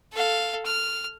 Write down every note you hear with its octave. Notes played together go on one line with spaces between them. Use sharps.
A4 F5
F6